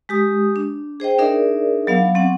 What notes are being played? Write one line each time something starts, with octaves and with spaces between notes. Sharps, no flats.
G#3 G4 D#6
D4
G#4 C5 D#5 G5
D4 D#4 G#4 A#4 D5 E5
F#3 B3 F5
F#3 C4 C#4 F#5